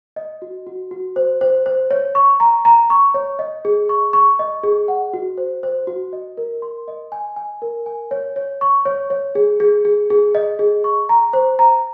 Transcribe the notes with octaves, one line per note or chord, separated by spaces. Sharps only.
D#5
F#4
F#4
F#4
C5
C5
C5
C#5
C#6
A#5
A#5
C#6
C#5
D#5
G#4
C#6
C#6
D#5
G#4
F#5
F#4
C5
C5
F#4
D#5
A#4
C6
D#5
G#5
G#5
A#4
G#5
C#5
C#5
C#6
C#5
C#5
G#4
G#4
G#4
G#4
D#5
G#4
C#6
A#5
C5
A#5